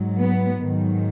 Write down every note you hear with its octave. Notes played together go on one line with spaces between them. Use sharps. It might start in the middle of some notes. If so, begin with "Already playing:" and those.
Already playing: G#2 F#3
B3
G#2 D#3 F#3